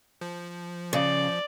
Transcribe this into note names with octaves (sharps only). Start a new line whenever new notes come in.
F3
C#3 D5